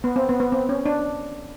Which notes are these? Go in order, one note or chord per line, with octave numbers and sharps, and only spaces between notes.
B3
C4
B3
B3
C4
C#4
D4